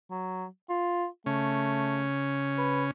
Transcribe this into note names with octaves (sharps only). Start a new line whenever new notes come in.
F#3
F4
C#3 A3 C#4
B4